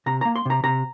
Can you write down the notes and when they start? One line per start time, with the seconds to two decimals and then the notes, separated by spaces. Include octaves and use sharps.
0.06 C3 A#5
0.21 A#3 A#5
0.36 C6
0.45 C3 A#5
0.63 C3 A#5